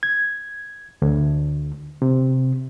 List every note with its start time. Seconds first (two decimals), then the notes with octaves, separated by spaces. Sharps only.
0.03 G#6
1.02 D2
2.02 C3